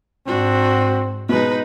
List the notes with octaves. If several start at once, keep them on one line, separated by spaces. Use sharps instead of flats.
G#2 C4 D4 F#4
B2 G#3 D#4 B4